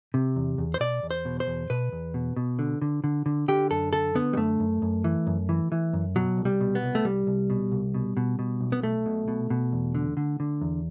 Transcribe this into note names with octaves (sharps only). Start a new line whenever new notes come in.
C3
E2
E2
C5
B2 D5
E2
C5
B2
C5
E2
B2 B4
E2
B2
B2
D3
D3
D3
D3
D3 G4
F#2 A4
D3 A4
D3 B3
G3
F#2 A3
F#2
F#2
E3
F#2
E3
E3
F#2
B2 F#3
C2
G3
B2
B3
C2
A3
C2 G3
C2
B2
C2
B2
B2
B2
B1
B3
B1 A3
B2
B2
B2
E2
D3
D3
D3
E2